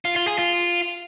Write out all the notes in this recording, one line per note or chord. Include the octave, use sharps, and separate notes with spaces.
F4
F4
G#4
F4